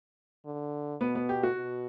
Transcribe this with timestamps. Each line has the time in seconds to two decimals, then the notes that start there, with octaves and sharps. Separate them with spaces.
0.45 D3
1.01 B2 B3
1.15 B3
1.29 G4
1.43 F#4
1.57 B2